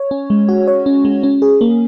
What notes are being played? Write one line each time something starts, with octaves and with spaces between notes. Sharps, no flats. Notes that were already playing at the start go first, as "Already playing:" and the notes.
Already playing: C#5
C#4
G#3
F#4
C#5
C#4
G#3
C#4
G#4
A#3